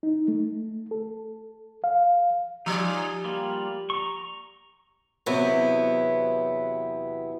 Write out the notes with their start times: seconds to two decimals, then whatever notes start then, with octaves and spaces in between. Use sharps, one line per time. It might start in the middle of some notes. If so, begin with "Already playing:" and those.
0.03 D#4
0.28 A3
0.91 A4
1.84 F5
2.66 F3 D#4 F4 G4 G#4 D5
3.25 G3 A#3 F4
3.90 A#5 C#6
5.26 E2 C3 F#3 B3 E4 C#5